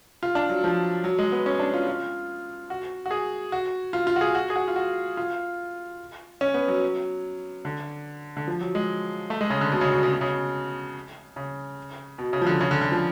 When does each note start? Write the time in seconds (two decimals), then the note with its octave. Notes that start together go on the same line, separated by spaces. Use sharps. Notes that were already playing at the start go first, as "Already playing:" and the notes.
0.23 F4
0.35 D4
0.49 F#3
0.64 F3
1.04 F#3
1.19 G#3
1.32 B3
1.46 C#4
1.59 D4
1.73 F4
1.87 F4
2.70 F#4
3.06 F#4
3.11 G#4
3.52 F#4
3.93 F4
4.07 F4
4.16 F#4
4.21 G#4
4.35 F#4
4.50 G#4
4.56 F#4
4.68 F4
4.76 F#4
5.17 F4
6.41 C#4
6.54 B3
6.68 F#3
7.65 D3
8.37 D3
8.48 F3
8.61 F#3
8.75 G#3
9.30 A3
9.41 G#3
9.50 C#3
9.61 D3
9.72 B2
9.81 C#3
9.92 B2
10.03 C#3
10.12 B2
10.21 C#3
11.36 C#3
12.18 B2
12.33 C#3
12.41 F3
12.47 D3
12.61 C#3
12.71 D3
12.81 D3
12.92 F3